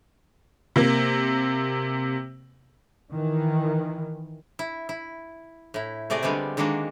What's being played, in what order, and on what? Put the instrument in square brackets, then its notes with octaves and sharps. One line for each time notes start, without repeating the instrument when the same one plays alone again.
[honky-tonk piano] C3 A#3
[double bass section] D#3 E3
[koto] E4
E4
A2 E4
C3 A3 G#4 D5 D#5 G#5
D3 G3 G#3 B3 C4
D3 D#3 G#3 A#3 D4 F#4